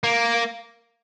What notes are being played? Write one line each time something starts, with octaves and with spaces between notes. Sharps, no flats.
A#3